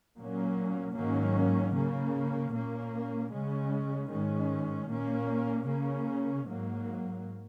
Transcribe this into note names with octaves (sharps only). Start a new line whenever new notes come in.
A#2 F#3 A#3 C#4
G#2 D#3 F#3 A#3 C#4
C#3 A#3 C#4
A#2 A#3 C#4
C#3 G#3 C#4
G#2 D#3 G#3 C#4
A#2 A#3 C#4
C#3 A#3 C#4
G#2 F#3 A#3